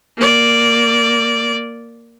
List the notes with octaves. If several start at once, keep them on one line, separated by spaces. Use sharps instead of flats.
A#3 D5